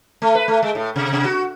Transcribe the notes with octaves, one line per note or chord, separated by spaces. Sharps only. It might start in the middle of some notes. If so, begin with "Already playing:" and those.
A3
B4
A3
G#3
A2
C3
C3
F#4